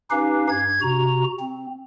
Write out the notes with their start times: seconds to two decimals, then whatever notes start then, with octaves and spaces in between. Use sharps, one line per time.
0.11 C#4 D#4 G4 B4 F5
0.49 G2 G#6
0.82 C3 F#4 A#5
1.40 C4